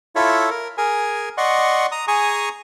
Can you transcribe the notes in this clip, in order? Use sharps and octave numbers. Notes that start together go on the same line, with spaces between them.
E4 F4 A4 C#5 E5
A#4
G#4 A#4 G#5
D5 D#5 F#5 C6 C#6
A#5 D#6
G#4 G#5 A#5 C#6 D#6